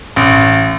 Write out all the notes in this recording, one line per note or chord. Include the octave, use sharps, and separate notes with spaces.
A1